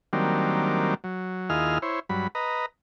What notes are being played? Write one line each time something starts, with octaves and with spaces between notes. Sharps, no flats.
D#3 F#3 G3 A#3 C4 D4
F#3
D#2 E4 F4 G#4 D#5 F6
E4 C5 C#5
G2 F#3 B5
B4 D#5 A#5